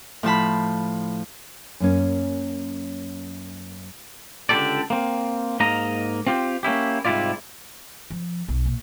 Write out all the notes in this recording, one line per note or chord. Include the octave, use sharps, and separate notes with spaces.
A2 F3 A5 B5
F#2 A#3 C#4
C#2 D3 E4 G4 A4 D5
A#3 C4
G#2 A#3 D#5 A#5
C4 F4 G4
A#3 C#4 E4 G4
G#2 C3 G3 E4 F4 D5
F3
B1
A#2